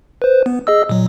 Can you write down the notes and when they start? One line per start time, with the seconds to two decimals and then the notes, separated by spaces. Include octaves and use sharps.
0.22 B4 C5
0.46 B3
0.67 G#4 D#5 E6
0.89 A#2 F#3